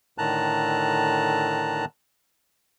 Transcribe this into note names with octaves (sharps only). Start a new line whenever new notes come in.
A2 D3 D#3 A5 A#5 F#6